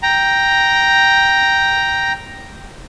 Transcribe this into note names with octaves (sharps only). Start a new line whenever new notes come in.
G5 A#5